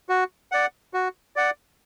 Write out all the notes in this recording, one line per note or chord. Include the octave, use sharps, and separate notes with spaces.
F#4
D5 F#5
F#4
D5 F#5